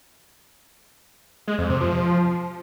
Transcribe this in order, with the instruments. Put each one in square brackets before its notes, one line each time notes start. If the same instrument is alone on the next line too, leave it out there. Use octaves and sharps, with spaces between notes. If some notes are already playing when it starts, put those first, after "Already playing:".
[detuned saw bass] G#3
F2
C3
F3